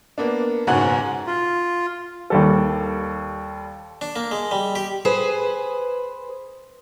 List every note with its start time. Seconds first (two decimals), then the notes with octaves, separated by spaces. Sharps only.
0.18 A#3 B3 D4
0.67 F#1 G#2 B2 C#4 F#5 G#5
1.27 F4
2.30 D#2 G3 A4
4.01 D4
4.16 A#3
4.31 G#3
4.51 G3
4.75 G4
5.05 G#4 B4 C5